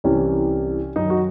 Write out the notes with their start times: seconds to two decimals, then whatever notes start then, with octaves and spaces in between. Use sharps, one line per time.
0.04 C2 C3 E3 C#4
0.96 F#2 D#3 D#4
1.10 F#4